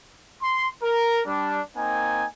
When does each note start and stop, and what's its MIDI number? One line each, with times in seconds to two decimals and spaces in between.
0.43 0.68 84
0.83 1.21 70
1.27 1.61 55
1.27 1.61 62
1.76 2.26 58
1.76 2.26 60
1.76 2.26 63
1.76 2.26 80